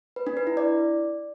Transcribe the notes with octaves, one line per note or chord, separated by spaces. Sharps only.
B4
D4
B4
E4
D5